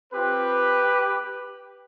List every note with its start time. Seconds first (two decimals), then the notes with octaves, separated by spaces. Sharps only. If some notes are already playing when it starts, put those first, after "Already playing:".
0.13 C4 F4 G4 B4